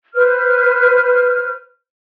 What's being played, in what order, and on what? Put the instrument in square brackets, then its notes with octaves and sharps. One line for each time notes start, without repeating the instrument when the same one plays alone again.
[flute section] B4 C5 F6